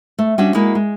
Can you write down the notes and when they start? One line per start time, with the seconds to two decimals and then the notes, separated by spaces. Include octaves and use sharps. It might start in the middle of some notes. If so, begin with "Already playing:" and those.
0.19 A3
0.38 G3 C#4 D4 F#4 E5
0.54 G#3 A#3 E4 F#4
0.75 G#3